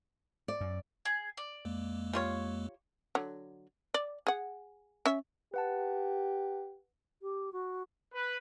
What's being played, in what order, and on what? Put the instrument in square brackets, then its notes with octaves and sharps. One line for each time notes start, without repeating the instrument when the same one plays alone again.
[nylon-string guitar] D5
[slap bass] F#2
[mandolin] G#4
D5
[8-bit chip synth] F2 G#3 A#3
[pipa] G3 F4 C#5
[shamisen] D3 F#3
D5
G#4 F#5
C#4 E5
[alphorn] G4 [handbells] B4 F#5 A5
[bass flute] G4
F#4
[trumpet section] B4